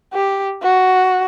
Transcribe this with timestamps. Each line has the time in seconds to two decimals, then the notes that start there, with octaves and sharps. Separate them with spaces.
0.13 G4
0.63 F#4